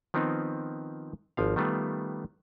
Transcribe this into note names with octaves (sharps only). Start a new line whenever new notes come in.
D#3 F3 B3 C4 D#4
G#1 F3 F5
D#3 G3 A3 B3 F4